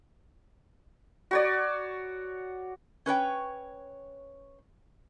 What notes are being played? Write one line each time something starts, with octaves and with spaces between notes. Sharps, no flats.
F#4 C#5 D5
C#4 B4 C#5 G5